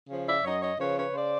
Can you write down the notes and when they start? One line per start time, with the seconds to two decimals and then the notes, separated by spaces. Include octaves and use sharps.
0.10 C#3 F3
0.27 D5 E5
0.44 F#2 C#5 D#5
0.61 C#5 D#5
0.79 C#3 F3 B4 C#5
0.97 B4 C#5
1.14 C#3 C5 D5